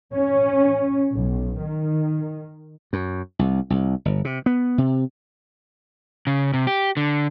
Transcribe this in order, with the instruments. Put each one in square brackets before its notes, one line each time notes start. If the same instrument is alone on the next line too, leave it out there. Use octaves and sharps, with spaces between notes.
[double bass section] C#4
B1
D#3
[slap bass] F#2
C2
C2
G1
C3
B3
C3
[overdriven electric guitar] C#3
C3
G4
D3